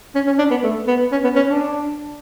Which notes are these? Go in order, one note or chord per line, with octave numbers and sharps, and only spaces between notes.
C#4
C#4
D4
B3
A3
B3
C#4
B3
C#4
D4